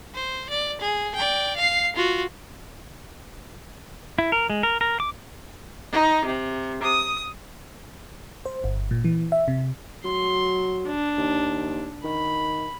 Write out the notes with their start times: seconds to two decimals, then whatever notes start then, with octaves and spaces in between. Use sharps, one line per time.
0.15 C5
0.50 D5
0.81 G#4
1.15 D5 G5
1.57 F5 C7
1.96 F4 F#4
4.19 E4
4.32 A#4
4.50 G#3
4.63 A#4
4.81 A#4
5.00 D6
5.92 D#4
6.25 C3
6.82 D#6
8.46 C5
8.64 G1
8.91 A#2
9.05 E3
9.32 E5
9.48 C3
10.04 F#3 C6
10.87 D4
11.18 D#2
12.04 D#3 B5